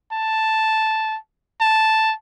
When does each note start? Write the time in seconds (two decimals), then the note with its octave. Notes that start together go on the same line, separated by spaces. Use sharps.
0.12 A5
1.61 A5